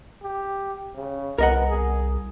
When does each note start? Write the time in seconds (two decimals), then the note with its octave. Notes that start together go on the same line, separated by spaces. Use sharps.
0.23 G4
0.95 C#3
1.38 C2 B3 A#4 D#5 F#5
1.68 G#4